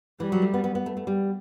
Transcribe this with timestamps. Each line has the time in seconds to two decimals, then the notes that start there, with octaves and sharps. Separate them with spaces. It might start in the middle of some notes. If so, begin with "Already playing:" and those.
0.20 E3 G3
0.32 F#3
0.42 A3
0.54 B3
0.64 B3
0.75 B3
0.86 A3
0.97 A3
1.07 G3